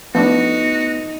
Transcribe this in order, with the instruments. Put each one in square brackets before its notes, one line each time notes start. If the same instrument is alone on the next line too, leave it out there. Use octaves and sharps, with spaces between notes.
[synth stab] F3 A3 D4 [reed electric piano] B3 [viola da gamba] D#4 [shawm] F#4